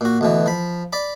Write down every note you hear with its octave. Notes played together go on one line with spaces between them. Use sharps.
A#2 F#4
D2 B2 E3
F3 B5
D5 B5